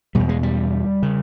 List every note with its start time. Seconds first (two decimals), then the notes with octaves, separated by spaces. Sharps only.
0.15 E2 B2 G3
0.29 G#3
0.43 G3
1.03 C#3